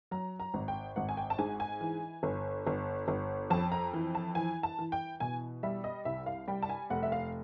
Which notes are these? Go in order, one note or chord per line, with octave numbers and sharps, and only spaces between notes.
F#3 A#5
A#5
G#1
G5
G#1 F#5
G#5
G5
A5
G#2 G#5
G#5
E3
G1
G1
G1
F2 A5
A#5
E3
A5
E3 G#5
A5
E3
G5
B2 G#5
G3 E5
D#5
C2 E5
F5
G3 G5
A5
G#5
F1 F#5
E5
F5